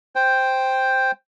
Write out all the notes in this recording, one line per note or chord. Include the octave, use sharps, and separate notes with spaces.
C5 G5